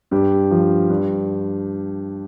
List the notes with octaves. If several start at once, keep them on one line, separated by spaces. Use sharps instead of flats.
G2 G4
F3
G2